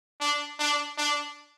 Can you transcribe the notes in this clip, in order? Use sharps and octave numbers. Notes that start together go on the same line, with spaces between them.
D4
D4
D4